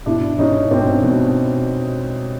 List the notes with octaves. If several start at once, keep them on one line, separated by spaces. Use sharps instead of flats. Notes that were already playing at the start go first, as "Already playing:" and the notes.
B2 D4 E4
B2 C#4 D#4
B2 C4 D4
B2